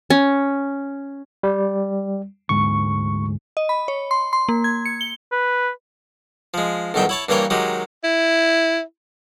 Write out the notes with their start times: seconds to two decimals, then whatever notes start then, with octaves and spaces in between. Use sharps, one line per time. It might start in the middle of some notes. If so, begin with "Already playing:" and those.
0.10 C#4
1.43 G3
2.49 D2 G#2 G#3 C#6
3.57 D#5
3.69 B5
3.88 C#5
4.11 C6
4.33 C6
4.49 A#3
4.64 G#6
4.85 C#7
5.01 G7
5.32 B4
6.54 F3 G#3
6.94 B1 E2 G2 D#3 E5 G5
7.09 E4 C#5 A5
7.29 G2 E3 A#3 A#4 C#5 G5
7.50 D#3 F#3 G#3 G4
8.04 E4